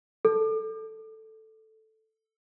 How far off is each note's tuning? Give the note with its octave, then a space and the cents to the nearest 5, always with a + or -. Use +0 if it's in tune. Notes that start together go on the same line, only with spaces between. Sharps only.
A4 +0